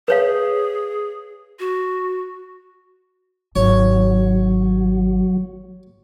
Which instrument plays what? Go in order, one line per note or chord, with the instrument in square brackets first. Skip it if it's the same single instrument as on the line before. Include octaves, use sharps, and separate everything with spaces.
[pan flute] G#4 [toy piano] B4 C#5 F5
[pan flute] F#4
[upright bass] G#1 [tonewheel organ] F#3 [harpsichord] C#5